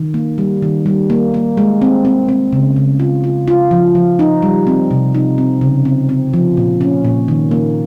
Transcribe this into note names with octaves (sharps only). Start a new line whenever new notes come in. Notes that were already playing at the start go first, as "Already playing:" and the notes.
Already playing: D#3
A#3
G3
D#3
G3
A#3
A#3
G#3
C4
C4
C4
C#3
C#3
F4
F4
F4
F3
F3
D#4
G3
C4
C3
D#4
C4
C#3
C4
C4
F3
A#2
C#4
A#2
D#3
A#3